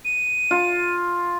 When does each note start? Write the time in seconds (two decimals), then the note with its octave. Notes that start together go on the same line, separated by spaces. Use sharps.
0.05 D#7
0.51 F4